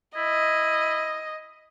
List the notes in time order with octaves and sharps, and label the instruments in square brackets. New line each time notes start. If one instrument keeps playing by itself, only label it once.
[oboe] E4 [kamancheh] D#5